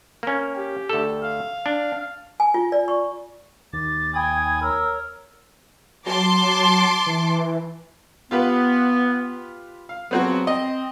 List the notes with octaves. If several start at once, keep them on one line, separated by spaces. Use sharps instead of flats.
A#3 C#4
G4
D2 A4
F5
D4
G#5
F4
D5
C#6
D#2 D6 A6
G5 G#5 B5 D#6 G#6
A#4 C#5 E6
F#3 A5 C6 D6
E3
B3 F4 G4 B4
F5
C#3 F3 F#3 B3 C4 F#4
C4 D#5